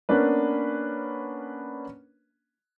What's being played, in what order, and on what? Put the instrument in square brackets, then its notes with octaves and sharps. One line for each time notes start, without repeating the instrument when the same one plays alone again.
[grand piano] A#3 B3 C#4 D4 B4